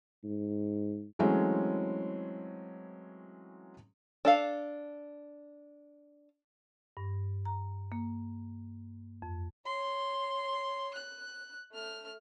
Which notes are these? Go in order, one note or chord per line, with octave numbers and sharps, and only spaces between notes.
G#2
E3 F#3 G#3 A3 C4 C#4
D4 A4 F5
G2
A#5
A#3
F2
C#5 C6
F#6
A3 F6